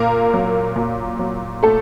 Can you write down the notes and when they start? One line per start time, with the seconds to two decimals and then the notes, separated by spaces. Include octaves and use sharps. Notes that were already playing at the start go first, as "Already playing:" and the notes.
Already playing: A#2 A#3 A#4
0.34 F#3
0.76 A#2
1.19 F#3
1.63 A3 A4